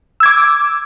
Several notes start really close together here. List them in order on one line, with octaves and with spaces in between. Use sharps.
E6 G#6 D6